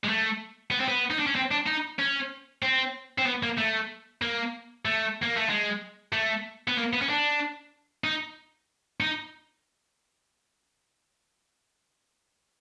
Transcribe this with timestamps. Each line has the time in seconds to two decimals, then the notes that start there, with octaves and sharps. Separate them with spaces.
0.04 G#3
0.08 A3
0.71 B3
0.80 C4
0.88 B3
1.10 D#4
1.19 D4
1.27 C#4
1.35 C4
1.51 D4
1.67 D#4
1.99 C#4
2.63 C4
3.18 C4
3.26 B3
3.43 A#3
3.58 A3
4.22 A#3
4.85 A3
5.22 A#3
5.36 A3
5.49 G#3
6.13 A3
6.68 B3
6.77 A#3
6.93 B3
7.01 C#4
7.09 D4
8.04 D#4
9.00 D#4